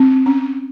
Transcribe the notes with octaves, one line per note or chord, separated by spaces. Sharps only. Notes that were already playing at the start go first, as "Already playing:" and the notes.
Already playing: C4
C#4